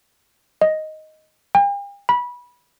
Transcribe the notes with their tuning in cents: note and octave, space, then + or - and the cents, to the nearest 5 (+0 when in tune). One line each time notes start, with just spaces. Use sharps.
D#5 +5
G5 +45
B5 -20